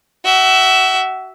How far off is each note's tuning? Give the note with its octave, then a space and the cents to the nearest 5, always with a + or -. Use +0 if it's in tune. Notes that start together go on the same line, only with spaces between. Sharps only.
F#4 +30 E5 +0